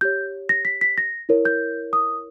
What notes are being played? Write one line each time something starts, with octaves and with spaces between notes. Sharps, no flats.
G4 C#5 G6
A#6
B6
B6
A#6
E4 A#4 C#5
G6
D#6